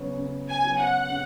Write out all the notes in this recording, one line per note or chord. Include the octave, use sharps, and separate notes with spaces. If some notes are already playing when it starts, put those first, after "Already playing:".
Already playing: C#3 F#3 B3 F#4 C#5
C#3
G#5
F#3 B3 F#4 C#5
F#5
C#3